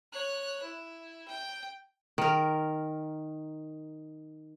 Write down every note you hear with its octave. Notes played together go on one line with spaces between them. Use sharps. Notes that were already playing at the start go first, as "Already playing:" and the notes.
C#5 F#6
E4
G5
D#3 A#4